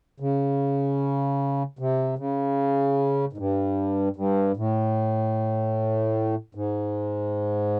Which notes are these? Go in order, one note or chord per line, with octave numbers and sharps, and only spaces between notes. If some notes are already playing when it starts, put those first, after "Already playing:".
C#3
C3
C#3
G#2
G2
G2
A2
G#2